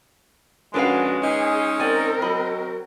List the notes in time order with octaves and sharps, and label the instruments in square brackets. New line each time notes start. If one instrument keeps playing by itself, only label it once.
[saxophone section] F2 D4 [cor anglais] G#3 [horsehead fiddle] C#4 F#4 [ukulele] A#4 B4 F5
[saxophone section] C#4 D#4 [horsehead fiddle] G#4
[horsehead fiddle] C4 A#4 [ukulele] D5 G#5
[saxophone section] F#3 [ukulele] D#5 B5